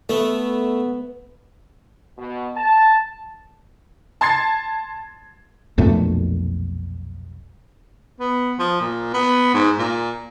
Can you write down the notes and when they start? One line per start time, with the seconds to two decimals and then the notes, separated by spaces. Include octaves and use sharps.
0.09 A3 B3
2.18 B2
2.57 A5
4.21 A5 C6 G#6 A6 C7
5.78 B1 F2 A#2 A3
8.20 B3
8.59 F3
8.81 A#2
9.14 B3
9.54 G#2
9.79 A#2